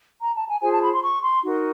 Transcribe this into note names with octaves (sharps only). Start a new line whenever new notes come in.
A#5
A5
G#5
F4 G#4 C5 G#5
A5
B5
C6
C#6
C6
D#4 F#4 A#4